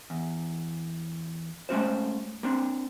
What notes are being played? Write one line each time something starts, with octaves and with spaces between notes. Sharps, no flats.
E2
G#3 A3 C#4 F#4 C5
A#3 C4 D4